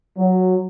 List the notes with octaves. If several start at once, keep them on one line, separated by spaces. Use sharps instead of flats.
F#3